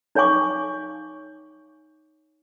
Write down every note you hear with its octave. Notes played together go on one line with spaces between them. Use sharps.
D#4 C#5 F5 G#5 C#6 D6